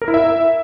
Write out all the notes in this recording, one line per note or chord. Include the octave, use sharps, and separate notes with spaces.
A#4
E4
E5